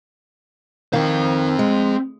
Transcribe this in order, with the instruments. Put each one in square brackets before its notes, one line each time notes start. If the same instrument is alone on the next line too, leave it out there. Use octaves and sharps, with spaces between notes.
[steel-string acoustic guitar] D#3 [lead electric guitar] C4 F5
[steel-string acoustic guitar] G#3